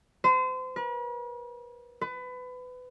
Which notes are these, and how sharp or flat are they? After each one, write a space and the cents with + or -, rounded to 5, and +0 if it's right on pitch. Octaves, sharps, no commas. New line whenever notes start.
C5 -35
B4 -45
B4 +25